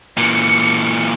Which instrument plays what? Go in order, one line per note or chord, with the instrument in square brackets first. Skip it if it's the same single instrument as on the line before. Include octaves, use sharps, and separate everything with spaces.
[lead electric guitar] A#2 E3 [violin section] C#7